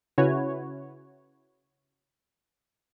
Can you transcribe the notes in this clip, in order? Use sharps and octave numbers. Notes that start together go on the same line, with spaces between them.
C#3 C#4 E4 F#4 B4 C#5